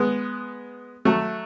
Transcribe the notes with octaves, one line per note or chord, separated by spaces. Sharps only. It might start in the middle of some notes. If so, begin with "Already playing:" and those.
Already playing: G#3 B3
F#3 A3